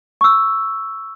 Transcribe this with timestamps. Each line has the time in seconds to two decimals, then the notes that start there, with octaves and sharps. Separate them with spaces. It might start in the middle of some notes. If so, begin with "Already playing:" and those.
0.21 C#6 E6